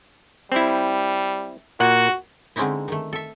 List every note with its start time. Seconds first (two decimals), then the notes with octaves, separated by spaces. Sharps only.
0.52 G3 C4 E4
1.80 A#2 F#4 F#5
2.56 D3 G#3 C4 C#4 D#4 E4
2.88 D#3 A3
3.13 A4 E5